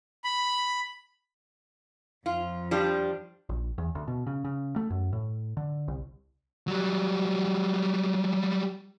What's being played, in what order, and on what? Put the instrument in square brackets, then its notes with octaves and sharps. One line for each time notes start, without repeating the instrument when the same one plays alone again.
[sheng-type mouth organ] B5
[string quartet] F2 [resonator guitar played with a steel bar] F4
[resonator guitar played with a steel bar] F3 G3 D4
[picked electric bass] A#1
E2
D2
B2
C#3
C#3
A3
F#2
A2
D3
C2
[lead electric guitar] F#3 G3